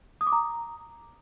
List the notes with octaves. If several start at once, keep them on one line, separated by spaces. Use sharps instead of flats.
D#6
D6
A#5